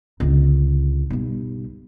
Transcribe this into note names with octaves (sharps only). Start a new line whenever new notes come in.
C#2 D3
B1 G2